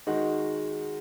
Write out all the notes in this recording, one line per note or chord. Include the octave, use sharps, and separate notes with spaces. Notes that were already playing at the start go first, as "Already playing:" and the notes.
D#3 G#3 D#4 F#4